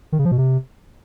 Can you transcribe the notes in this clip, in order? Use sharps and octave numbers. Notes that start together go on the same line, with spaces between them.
D#3
C#3
F3
B2
C3